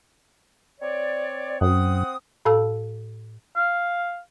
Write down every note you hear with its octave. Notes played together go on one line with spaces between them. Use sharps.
C4 C#5 D5
F#2 C4 F#5 D#6
A2 A4 F5 A5 E6
F5